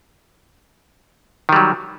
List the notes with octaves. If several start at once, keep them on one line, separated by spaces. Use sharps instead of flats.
D#3 F#3 G3